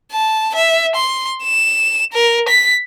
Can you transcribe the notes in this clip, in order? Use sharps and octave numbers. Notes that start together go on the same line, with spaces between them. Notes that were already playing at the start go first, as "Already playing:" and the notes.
A5
E5
C6
E7
A#4
B6